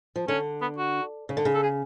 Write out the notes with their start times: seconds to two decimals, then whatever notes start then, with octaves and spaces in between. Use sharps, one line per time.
0.16 F3
0.28 D3 C#4
0.62 B3
0.78 F#4
1.29 C#3
1.37 D3
1.45 C#3
1.55 A4
1.63 G#4